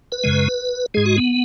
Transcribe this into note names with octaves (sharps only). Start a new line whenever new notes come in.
B4
F#2 C#3 G#3
G#2 G#3 G#4
F#4
B3